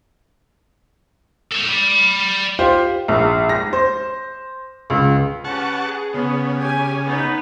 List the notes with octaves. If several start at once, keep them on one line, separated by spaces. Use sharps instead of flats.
A4 C#5
D5 B5
F4 G4 C5
A#1
A#6
C5
C#2
C#4 G4 B4 F#5 A5 C#6
G#4
C#3 B3
G4 G#5
B3 D#4 B4